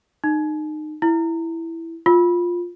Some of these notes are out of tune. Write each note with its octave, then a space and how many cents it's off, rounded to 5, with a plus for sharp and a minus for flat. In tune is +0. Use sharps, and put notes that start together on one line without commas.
D#4 -25
E4 +5
F4 +5